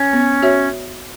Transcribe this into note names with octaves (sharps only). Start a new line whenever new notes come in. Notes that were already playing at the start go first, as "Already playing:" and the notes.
Already playing: C#4
B3
F#4 C#5 E5